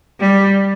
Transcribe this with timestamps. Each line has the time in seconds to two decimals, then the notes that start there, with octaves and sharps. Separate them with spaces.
0.20 G3